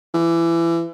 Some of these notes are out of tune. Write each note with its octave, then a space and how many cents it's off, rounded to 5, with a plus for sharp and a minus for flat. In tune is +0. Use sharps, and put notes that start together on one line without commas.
E3 +25